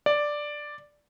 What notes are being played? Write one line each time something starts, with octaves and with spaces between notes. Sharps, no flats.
D5